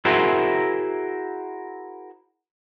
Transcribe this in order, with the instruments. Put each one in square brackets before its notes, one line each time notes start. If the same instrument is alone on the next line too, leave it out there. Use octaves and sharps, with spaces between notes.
[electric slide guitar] E4 F#4 G#4 A#4 C5 E5